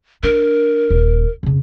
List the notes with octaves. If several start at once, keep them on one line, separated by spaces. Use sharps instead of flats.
D4 A#4
D#1
F2 C#3